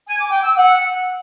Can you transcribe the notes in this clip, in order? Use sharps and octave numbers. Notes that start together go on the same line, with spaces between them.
G#5
D6
G5
E6
F#5